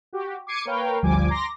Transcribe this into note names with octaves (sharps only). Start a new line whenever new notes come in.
F#4 G4
D6 G#6 C7 C#7 D#7
A#3 A#4 B4 C#5 F5 G5
G1 D2 F3 G3 G#5 D6
A#5 C6 D6 A#6